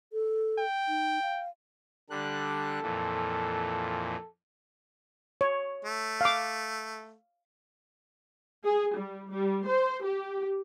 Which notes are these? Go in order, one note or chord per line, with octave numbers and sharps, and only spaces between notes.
A4
G5
D#4
F5
D3 G3 A4 F#6
F2 A#2 E3
C#5
A3
F5 D6
G#4
G3
G3
C5
G4